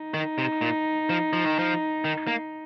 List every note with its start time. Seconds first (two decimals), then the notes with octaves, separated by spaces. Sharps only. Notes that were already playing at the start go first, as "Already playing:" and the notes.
Already playing: D#4
0.14 D#3
0.38 C3
0.61 A#2
1.10 F3
1.33 F3
1.46 D#3
1.59 F3
2.05 D#3
2.27 A#3